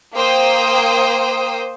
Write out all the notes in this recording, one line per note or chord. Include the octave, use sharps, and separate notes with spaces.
A#3 C5 G5 D#6